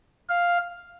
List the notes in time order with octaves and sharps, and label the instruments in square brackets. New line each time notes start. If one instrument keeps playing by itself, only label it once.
[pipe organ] F5